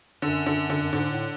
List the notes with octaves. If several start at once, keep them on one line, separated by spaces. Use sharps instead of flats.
F#2 D3
D3
D3
F#2
G#2 D3
A2